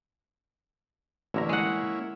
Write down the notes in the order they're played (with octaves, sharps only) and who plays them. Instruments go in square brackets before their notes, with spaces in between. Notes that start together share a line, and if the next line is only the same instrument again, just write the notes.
[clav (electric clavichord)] A1 D3 A#5 [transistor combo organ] A#3 C#4 E4
[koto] G#3 F#5